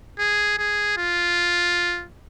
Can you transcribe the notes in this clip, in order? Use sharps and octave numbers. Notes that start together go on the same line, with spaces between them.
G#4
G#4
F4